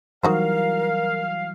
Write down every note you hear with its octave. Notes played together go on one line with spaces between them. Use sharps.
E3 F#3 G3 D#4 F#4 A#4 C5 F5